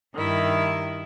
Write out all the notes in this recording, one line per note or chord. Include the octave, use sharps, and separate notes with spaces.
G2 D#3 E4 E5